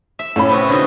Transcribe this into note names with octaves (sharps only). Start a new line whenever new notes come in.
E5
A2 C#4 B5
C3 B3 F#4
D3 D#4 F#4